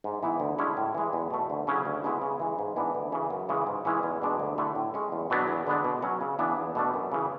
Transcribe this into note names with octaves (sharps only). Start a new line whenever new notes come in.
G#2
E3 B3 E4
D2
D3 G#3 C#4 E4
A2
E3 G#3
E2
B2 A3
D2
C#3 F#3 C#4 E4
D2
C#3 G#3 B3 E4
C#3
E3 G#3
G#2
E3 B3 D4
D2
C#3 E3
F#2
C#3 E3 G#3
G#2
E3 G#3 C#4 E4
E2
B2 G#3 D4
D2
D3 A3 E4
A2
G#3 C#4
E2
B2 F#3 B3 D4
E2
D3 G#3 B3 D4
B2
F#3 C#4
C#3
E3 B3 D4
E2
B2 A3 D4
F#2
C#3 E3